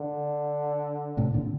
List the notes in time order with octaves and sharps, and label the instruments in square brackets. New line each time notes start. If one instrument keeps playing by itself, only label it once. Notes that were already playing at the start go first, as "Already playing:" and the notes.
Already playing: [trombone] D3
[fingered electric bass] A2 C3
A#2 D3